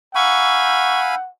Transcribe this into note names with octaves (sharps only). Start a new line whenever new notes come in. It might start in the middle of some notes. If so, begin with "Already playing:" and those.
D#4 F5 F#5 G#5 B5 C#6 E6 G6